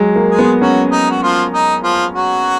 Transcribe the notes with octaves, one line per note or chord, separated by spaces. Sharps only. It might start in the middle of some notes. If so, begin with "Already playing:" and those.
Already playing: F#3 G#3
A#3
G#3 G#4
B3
F#3 C#4 F#4
D#4
F#4
F3 F4
D#4
F3 F4
F#3 F#4